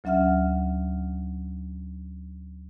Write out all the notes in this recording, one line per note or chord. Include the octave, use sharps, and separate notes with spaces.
D2 F#3 C#4 E5 F#5 F6